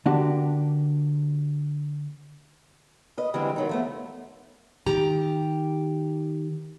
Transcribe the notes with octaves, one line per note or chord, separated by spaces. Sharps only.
D3 A#3 D4 F#4 G4
B4 D#5
D3 E3 G3 G#3 C4
D#3 F#3 D#4
F3 A3 B3
D#3 G4 A#5